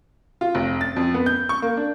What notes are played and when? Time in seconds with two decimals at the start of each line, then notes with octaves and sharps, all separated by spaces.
0.41 F4
0.55 F1
0.81 A6
0.96 F2
1.14 B3
1.26 G6
1.49 C#6
1.62 A#3
1.77 D4